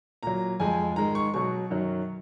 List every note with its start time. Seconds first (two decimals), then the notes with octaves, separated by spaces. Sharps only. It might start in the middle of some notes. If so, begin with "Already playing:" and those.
0.23 A#2 F#3 A#5
0.60 F2 F3 G#3 G#5
0.96 G#2 D#3 G#3 A#5
1.15 C#6
1.34 B2 F#3 C#6
1.71 F#2 D#3 F#3